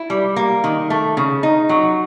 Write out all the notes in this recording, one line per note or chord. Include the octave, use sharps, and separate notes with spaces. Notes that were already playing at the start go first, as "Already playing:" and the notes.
Already playing: E4
G3
A#3
D#3
A3
C#3
D#4
F#3